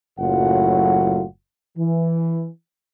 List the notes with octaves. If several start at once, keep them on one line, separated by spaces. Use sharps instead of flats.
F#1 A2 F#3 F4 F#5
E3